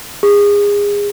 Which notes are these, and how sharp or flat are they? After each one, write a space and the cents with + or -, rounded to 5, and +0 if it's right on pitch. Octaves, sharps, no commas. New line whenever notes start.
G#4 -30